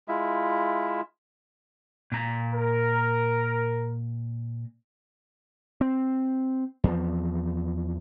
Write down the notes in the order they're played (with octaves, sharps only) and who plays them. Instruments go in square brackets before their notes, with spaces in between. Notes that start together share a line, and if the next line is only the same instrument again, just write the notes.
[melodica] G#3 E4 F4 E5
[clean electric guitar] A#2 A#5
[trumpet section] A#4
[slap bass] C4
E2 F3